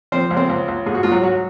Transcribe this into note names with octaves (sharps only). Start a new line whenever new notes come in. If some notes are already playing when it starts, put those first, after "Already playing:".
F3 C4 C5
C#2
C4 C5
C#2
C#2
G#2 G#4
F#4
G#2 F4
F#3 F#4
F#3 F#4